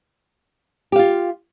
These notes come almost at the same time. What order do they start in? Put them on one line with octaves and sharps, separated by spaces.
G4 F5 F4